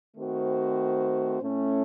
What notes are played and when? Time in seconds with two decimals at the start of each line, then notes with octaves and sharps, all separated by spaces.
0.16 D#3 A3 C4 F#4 C5
1.40 A2 A3 C#4